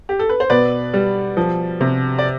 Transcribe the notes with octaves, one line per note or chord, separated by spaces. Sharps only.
G4
A4
B4
C5
B2 B4 D5
G3
F3
C3
D5